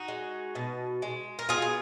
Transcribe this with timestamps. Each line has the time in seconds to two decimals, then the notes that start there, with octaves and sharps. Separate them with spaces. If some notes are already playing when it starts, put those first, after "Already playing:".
Already playing: D#4 F#4
0.08 G#3
0.55 B2
1.02 G#3
1.39 A#4
1.49 B2 F4 G#4
1.62 G#4